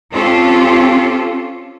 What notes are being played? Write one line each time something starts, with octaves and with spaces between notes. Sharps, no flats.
C4 C#4 F4 G4 A4